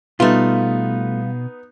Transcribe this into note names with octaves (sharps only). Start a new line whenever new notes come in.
B2 G3 A3 B3 D#4 F4 F5